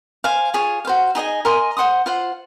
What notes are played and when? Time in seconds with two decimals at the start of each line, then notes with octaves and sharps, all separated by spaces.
0.24 C5 F5 G#5
0.54 F4 G#4 C#5
0.85 F#4 C5 F5
1.15 D#4 G#4 D#5 G#5
1.45 A#4 D#5 G#5 C6
1.77 C5 F#5 C6 D#6
2.06 F4 C5 F#5